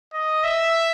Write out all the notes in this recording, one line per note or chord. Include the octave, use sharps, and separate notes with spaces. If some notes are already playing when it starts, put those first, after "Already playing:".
D#5
E5